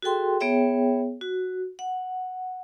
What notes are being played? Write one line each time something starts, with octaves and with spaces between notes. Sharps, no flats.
F#4 G#4 A4 G5 C6
B3 G#4 C#5 E5 G5
F#4
F#5